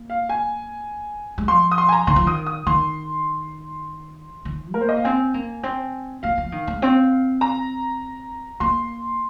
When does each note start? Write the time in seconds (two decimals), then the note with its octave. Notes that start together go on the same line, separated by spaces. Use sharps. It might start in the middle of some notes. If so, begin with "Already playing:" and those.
Already playing: A#3
0.10 F5
0.29 G#5
1.38 G#3
1.48 F3 C6
1.71 D#6
1.78 C6
1.89 G#5
1.93 A#5
2.07 D#3 C6
2.16 F3
2.26 D#3 D#6
2.46 D#6
2.67 D#3 C6
4.45 D#3
4.74 A#3 A#4
4.81 C5
4.89 D#5
4.97 F5
5.04 C4 G#5
5.34 A#3
5.63 C4
6.23 A#3 F5
6.38 F3
6.52 D#3
6.67 G#3
6.82 C4
7.41 A#5
8.60 A#3 C6